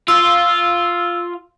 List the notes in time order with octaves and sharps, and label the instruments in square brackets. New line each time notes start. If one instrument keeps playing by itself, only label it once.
[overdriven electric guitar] F4 [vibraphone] E6